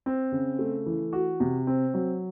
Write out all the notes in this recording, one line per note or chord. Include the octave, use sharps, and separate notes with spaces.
C4
C#3
A3
E3
F#4
C3
C4
F#3